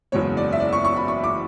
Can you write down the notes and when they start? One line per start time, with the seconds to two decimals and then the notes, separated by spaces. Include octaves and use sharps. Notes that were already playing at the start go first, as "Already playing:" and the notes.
0.12 F#1 E2 B2 G#3 B3 C#5
0.37 D5
0.53 E5
0.60 D5
0.73 C#6
0.85 C#6
0.96 B5
1.08 C#6
1.24 D6